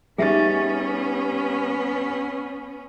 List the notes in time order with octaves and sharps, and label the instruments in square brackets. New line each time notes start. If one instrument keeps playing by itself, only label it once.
[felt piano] G3 D#4 A6 [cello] B3 C#4 [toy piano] G#4 E5